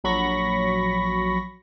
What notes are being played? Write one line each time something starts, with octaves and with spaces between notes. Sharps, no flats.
A#1 F#3 B5 C#6 A#6